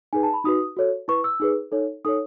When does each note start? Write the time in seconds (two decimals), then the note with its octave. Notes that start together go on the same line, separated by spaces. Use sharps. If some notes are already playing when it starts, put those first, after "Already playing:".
0.13 D#4 G#4 B4 G#5
0.23 A5
0.34 B5
0.44 D#4 F#4 B4 D#6
0.77 F#4 A4 C#5
1.08 E4 B4 C#6
1.24 E6
1.40 D#4 G#4 B4
1.72 D#4 A4 C#5
2.05 D#4 A4 C#5 D#6